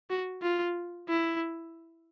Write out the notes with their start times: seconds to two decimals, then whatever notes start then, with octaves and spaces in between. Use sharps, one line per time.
0.10 F#4
0.42 F4
1.09 E4